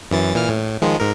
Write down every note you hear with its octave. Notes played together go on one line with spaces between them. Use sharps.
F#2 E3 A6
A#2 E3 F6
A2
D#3 F3 G#3
G#2 A#4